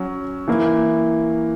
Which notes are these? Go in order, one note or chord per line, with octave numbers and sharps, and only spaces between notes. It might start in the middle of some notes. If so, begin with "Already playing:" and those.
Already playing: F#3 C#4
E3 A#3 E4